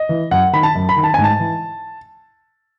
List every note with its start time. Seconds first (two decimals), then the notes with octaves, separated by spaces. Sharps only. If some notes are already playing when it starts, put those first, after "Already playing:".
Already playing: D#5
0.09 E3
0.31 F#2 F#5
0.53 D#3 B5
0.63 A5
0.75 F#2
0.89 B5
0.96 D#3
1.04 A5
1.14 G#2 G#5
1.24 A5
1.39 E3